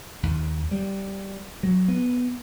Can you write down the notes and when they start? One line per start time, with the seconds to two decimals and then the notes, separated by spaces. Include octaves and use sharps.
0.23 D#2
0.71 G3
1.63 F#3
1.88 B3